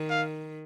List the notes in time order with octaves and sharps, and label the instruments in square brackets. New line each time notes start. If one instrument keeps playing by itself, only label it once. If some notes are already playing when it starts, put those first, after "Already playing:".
Already playing: [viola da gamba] D#3
[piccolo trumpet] F5